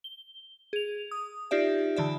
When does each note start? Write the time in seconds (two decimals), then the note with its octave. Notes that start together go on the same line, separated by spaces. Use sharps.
0.04 G7
0.73 G#4 F7
1.11 D#6
1.51 D#4 F4 G4 D5 E5
1.96 D3 E3 D5 E5